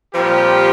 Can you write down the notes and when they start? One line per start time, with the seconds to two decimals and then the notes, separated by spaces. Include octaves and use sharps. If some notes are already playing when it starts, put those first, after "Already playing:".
0.14 A#2 F3 G3 C4 G4